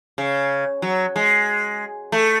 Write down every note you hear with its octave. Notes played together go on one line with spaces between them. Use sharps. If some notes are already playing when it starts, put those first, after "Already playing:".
C#3
F#3
G#3
A3